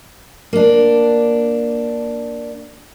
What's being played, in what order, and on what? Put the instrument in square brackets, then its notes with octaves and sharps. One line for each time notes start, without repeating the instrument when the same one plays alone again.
[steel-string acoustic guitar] A#3 D4